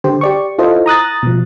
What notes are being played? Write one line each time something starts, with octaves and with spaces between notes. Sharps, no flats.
D3 G4 C5
G4 D5 C#6
E4 F4 A4 C5 D#5
A#5 D#6 F#6 A6
B2 F3